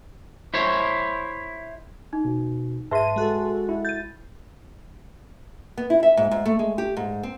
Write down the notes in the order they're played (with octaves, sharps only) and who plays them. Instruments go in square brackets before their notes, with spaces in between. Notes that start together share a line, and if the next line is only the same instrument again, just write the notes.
[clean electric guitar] E4 C5 C#5
[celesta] D#4
[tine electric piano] B2
[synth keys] G#2 D#7 [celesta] B4 E5 [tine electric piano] A5 C6
[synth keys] G#3 F#4 A4
[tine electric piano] E4
[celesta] G6 D#7 [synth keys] A6
[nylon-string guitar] B3
E4
E5
G#2
G#2
A3
G#3
G4
G#2
C4